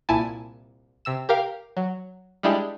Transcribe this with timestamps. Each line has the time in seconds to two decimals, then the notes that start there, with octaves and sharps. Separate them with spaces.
0.09 C2 A#2 E4 G#5 A5
1.05 C3 E6 E7
1.29 G4 A#4 F5
1.77 F#3
2.43 G3 G#3 D4 E4 G4 G#4